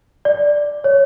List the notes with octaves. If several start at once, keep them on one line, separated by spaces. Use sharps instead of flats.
D5
C#5